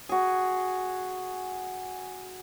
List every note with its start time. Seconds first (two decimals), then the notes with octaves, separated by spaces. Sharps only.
0.09 F#4 G#4